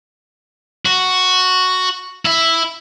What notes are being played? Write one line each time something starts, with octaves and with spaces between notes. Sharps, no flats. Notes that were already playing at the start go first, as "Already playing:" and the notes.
F#4
E4 E5